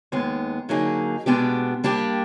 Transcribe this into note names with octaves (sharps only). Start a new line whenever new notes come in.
D#2 D#3 G#3 B3
D3 F#3 A#3 D#4 G#4
B2 G#3 B3 D4 G4
G3 A#3 D4 G4